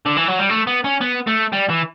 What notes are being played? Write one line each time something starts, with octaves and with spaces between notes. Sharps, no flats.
D3
E3
F#3
G3
A3
B3
C#4
B3
A3
G3
E3